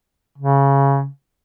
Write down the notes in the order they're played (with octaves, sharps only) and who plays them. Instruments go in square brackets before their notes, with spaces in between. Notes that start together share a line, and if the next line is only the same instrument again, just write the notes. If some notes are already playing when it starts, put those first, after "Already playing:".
[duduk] C#3